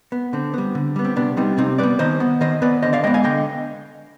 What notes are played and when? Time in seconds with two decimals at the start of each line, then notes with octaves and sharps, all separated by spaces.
0.12 B3
0.33 D3 C4
0.54 G3 B3
0.75 D3
0.96 G3 B3
1.05 C4
1.16 C3 B3 D4
1.37 G3 B3 C4 D#4
1.58 C3 C4 D#4
1.78 G3 B3 B4 D5
1.99 D#3 C5 D#5
2.20 B3
2.41 D#3 C5 D#5
2.62 B3 B4 D5
2.82 D3 C5 D#5
2.93 D5 F5
3.04 G#3 B3 D#5 G5
3.14 F5 G#5
3.24 D3 D#5 G5